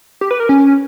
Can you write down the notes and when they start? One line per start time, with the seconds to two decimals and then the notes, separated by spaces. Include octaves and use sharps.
0.21 G4
0.31 B4
0.40 A#4
0.49 C#4